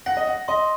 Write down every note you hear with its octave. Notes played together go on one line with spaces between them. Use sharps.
F#5 A#6
D#5
F#5
D#5 C6